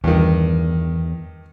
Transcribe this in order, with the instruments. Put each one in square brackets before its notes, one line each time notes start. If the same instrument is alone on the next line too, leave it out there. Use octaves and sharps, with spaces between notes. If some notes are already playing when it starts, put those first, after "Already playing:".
[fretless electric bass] E2 [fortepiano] G2 D#3